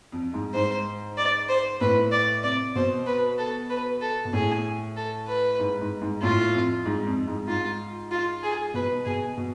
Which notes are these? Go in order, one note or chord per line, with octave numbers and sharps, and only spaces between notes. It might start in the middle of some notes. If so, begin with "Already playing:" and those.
F2
G#2
G#2 C5
D5
C5
A2 B4
D5
C3 D5
B2 C5
B4
A4
B4
A4
B2
A2 G#4
A4
B4
G#2
G#2
G#2
A2 F4
F2
G#2
F2
G#2
G#2 F4
F4
G#4
B2 B4
B2 G#4
B2